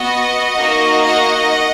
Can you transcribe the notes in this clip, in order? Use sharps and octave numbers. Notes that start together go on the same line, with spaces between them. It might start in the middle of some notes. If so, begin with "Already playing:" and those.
Already playing: B3 F#4 D#5 F#5
A#3 D#4 F#4
D#5 F#5